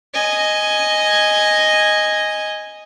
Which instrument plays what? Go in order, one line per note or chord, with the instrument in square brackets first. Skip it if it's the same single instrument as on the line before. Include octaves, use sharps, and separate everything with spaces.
[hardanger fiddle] D#5 G#5